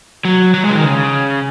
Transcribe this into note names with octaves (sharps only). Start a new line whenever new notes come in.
F#3
F#3
G#3
C#3
D#3
C#3